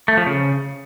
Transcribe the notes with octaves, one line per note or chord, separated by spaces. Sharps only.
A3
F3
C#3